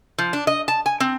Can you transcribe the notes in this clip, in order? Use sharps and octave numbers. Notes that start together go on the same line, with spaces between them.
F3
D4
D#5
A5
G#5
C4